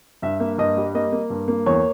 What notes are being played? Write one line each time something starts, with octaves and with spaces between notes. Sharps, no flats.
G2 E5
A#3
G2 D#5
G3
A#3 D#5
A#3
G2
A#3
E2 C#5